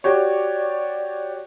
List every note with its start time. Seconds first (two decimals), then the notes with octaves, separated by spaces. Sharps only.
0.04 F#4 G4 C#5 D5